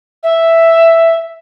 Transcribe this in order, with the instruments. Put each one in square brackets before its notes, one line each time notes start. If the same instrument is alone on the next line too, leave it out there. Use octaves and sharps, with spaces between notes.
[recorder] E5